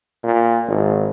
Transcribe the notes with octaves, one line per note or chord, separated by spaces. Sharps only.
A#2
G#1